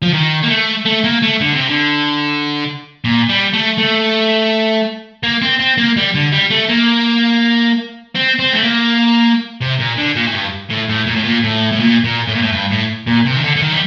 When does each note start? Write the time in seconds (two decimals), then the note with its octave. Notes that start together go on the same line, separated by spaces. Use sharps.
0.02 F3
0.13 D#3
0.43 A#3
0.49 A3
0.86 A3
1.04 A#3
1.22 A3
1.41 D3
1.54 C3
1.67 D3
3.04 A#2
3.29 G3
3.53 A3
3.78 A3
5.23 A#3
5.42 C4
5.60 C4
5.78 A#3
5.97 G3
6.14 D3
6.32 G3
6.51 A3
6.69 A#3
8.15 C4
8.39 C4
8.53 A3
8.63 A#3
9.61 C3
9.79 A#2
9.97 D3
10.15 A#2
10.27 A2
10.33 G2
10.70 A2
10.88 A2
11.06 A#2
11.15 A2
11.23 A#2
11.43 A2
11.72 A2
11.80 A#2
12.04 A#2
12.28 A2
12.35 A#2
12.42 A2
12.52 G2
12.71 A2
13.07 A#2
13.25 C3
13.36 D#3
13.43 D3
13.56 D3
13.62 D#3
13.72 G3